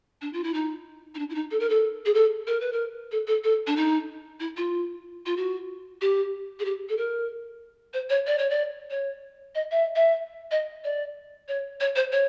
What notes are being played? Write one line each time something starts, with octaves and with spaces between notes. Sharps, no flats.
D4
F4
E4
D#4
D#4
D4
E4
D#4
A4
A#4
A4
G#4
A4
A#4
B4
A#4
A4
A4
A4
D4
D#4
E4
F4
F4
F#4
G4
G#4
G4
A4
A#4
C5
C#5
D5
C#5
D5
C#5
D#5
E5
E5
D#5
D5
C#5
C#5
C5
C#5